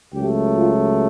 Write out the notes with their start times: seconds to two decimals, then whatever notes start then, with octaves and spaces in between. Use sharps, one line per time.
0.12 C#2 C#3 F#3 A3 G4
0.56 F4